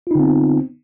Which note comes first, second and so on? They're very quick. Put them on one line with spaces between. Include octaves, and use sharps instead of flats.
F4 D#4 D3 C4 B3